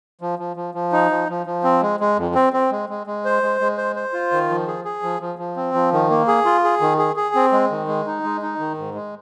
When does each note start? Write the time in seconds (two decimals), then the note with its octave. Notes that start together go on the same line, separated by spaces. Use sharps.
0.21 F3
0.39 F3
0.56 F3
0.75 F3
0.92 D#4
1.11 F3
1.29 F3
1.46 F3
1.64 C4
1.81 G#3
2.00 G#3
2.17 F2
2.35 C4
2.53 C4
2.71 G#3
2.89 G#3
3.07 G#3
3.25 C5
3.43 G#3
3.61 G#3
3.78 C5
3.96 C5
4.13 F4
4.32 D#3
4.49 F3
4.67 G#4
4.85 G#4
5.03 F3
5.20 F3
5.39 F3
5.56 C4
5.74 F3
5.93 D#3
6.10 A#3
6.28 G#4
6.45 F4
6.64 G#4
6.81 D#3
6.99 G#4
7.16 G#4
7.35 C4
7.52 G#3
7.71 D#3
7.88 G#3
8.07 D#4
8.24 G#3
8.42 D#4
8.59 D#3
8.78 G#2
8.95 G#3